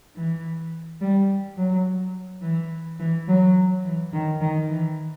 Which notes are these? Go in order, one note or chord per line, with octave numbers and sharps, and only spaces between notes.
E3
G3
F#3
E3
E3
F#3
E3
D#3
D#3
E3